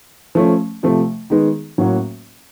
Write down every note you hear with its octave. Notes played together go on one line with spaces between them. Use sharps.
F3 A3 C#4
C3 F3 A3
D#3 G#3 B3 D#4
A2 F#3 A#3 C#4 F#4